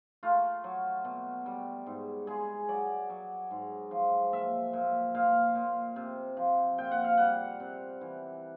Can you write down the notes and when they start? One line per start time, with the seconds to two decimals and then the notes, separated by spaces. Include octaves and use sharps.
0.23 A3 F4
0.64 F#3
1.05 B2
1.46 G3
1.86 G#2
2.27 G#3 G#4
2.69 F#3 D5
3.10 F#3
3.51 G#2
3.91 F3
4.33 A#2 E5
4.73 A#2
5.15 A#2 F5
5.55 A#2
5.96 C3
6.37 F3
6.78 A#2 G5
6.91 F#5
7.04 F5
7.17 G3 F#5
7.60 C3
8.01 E3